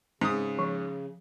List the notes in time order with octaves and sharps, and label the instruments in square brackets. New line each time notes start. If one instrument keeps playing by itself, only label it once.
[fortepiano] G#2 D#6 [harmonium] C#3
[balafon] F3